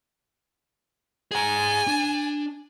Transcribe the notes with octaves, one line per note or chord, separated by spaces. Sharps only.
G#4 G#5 A#5
D4